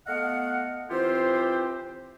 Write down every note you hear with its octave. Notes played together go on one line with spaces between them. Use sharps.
A3 B3 D#5 F5 F#5
E3 C4 F4 G4 C5